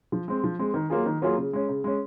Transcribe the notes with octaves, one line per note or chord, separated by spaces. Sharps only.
F3
G#3 C4
F3
G#3 C4
D#3
F#3 A#3 F4 G#4
D#3
F#3 A#3 F4 G#4
C#3
G#3 C#4
C#3
G#3 C#4